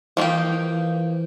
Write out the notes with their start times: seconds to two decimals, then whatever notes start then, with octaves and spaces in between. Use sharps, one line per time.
0.17 E3 F3 A#3 D#4 G4
0.47 E3